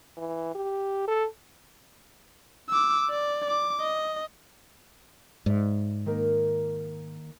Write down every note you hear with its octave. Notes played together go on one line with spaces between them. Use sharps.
E3
G4
A4
D6 E6
D5
D6
D#5
G#2 D5 E5
D#3 A#3 A#4